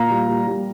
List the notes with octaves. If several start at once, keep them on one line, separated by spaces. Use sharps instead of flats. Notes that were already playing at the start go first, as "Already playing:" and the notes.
Already playing: A#2 F5 A#5
G3
G3
G3